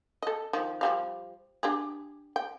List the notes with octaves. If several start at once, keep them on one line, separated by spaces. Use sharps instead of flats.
A4 D#5
D#3 F3
F3 G3 F5
D4 G4 G#4
G5